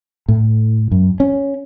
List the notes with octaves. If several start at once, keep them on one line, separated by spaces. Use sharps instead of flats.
A2
F#2
C#4